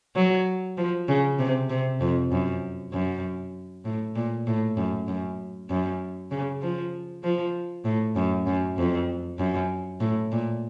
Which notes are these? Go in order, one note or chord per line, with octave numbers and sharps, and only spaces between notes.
F#3
F3
C#3
C3
C3
F2
F#2
F#2
A2
A#2
A2
F#2
F#2
F#2
C#3
F3
F3
A2
F#2
F#2
F2
F#2
A2
A#2